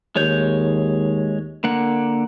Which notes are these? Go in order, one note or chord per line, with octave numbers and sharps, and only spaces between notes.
D#2 G#3 C#5 G6
D3 A#3 F#5